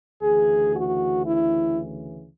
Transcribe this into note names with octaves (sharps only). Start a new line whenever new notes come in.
D2 C#3 E3 G#4
F#4
E4